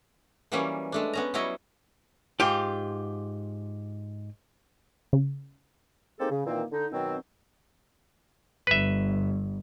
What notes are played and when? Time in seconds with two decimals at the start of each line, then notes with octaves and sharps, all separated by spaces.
0.52 E3 F#3 G3 A#3 C#4
0.92 G#3 A3 D4
1.13 B3 C#4 A#5
1.34 F#3 G3 E4 C#5 D#5
2.40 G#2 F4 G4
5.13 C#3
6.19 G#3 A#3 C4 D#4 G4 A4
6.31 C#3
6.46 A#2 D#3 E3 A#3 C4
6.72 D3 D#4
6.92 B2 D#3 F#3 C4
8.67 G1 B4 E5